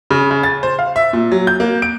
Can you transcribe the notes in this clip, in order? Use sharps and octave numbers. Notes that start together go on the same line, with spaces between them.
C#3
C#3
A6
C5
F5
E5
A#2
F#3
G6
A#3
D7